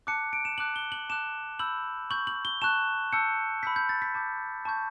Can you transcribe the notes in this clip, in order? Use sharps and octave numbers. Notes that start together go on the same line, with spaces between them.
A5 D6 F#6 C#7
D7
E7
A5 D6 F#6 F#7
G7
F#7
A5 D6 F#6 E7
B5 E6 G6 F#7
C#6 G6 F#7
F#7
G7
A5 C#6 F#6 E7
A5 E6 G6 C#7
B5 E6 G6 B6
G6
A6
B6
A5 D6 G6
A5 C#6 G6